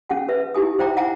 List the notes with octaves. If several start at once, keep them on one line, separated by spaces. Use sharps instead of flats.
C#4 G#4 F#5 G#5
B4 E5
D#4 E4 G4 G#5 D#6
E4 C5 E5 G5 A#5 D6
E5 F#5 G#5 A#5